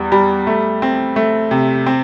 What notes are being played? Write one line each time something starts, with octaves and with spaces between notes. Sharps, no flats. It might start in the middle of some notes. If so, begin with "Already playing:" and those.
Already playing: E2 G3
G3
A3
C4
A3
C3
C4